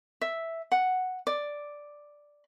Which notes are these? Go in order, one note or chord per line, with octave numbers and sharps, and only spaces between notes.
E5
F#5
D5